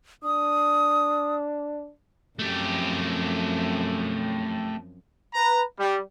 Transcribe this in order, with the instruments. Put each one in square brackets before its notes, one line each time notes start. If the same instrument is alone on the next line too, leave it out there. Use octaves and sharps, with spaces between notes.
[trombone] D4 [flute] D#6
[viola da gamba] F#2 F3 C4 [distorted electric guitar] A3 G4
[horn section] B4 A#5
G3